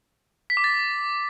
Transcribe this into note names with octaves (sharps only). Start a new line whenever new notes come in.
B6
D6
A6